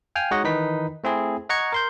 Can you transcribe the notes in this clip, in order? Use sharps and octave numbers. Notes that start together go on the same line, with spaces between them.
F5 G5 G#5 F6
G#3 D#4 F#4 C#5 D#5 F#5
D#3 E3 D#4 B4 B6
A3 C4 E4 G#4
D#5 F#5 A#5 C#6 G#6 C#7
A#4 C6 G6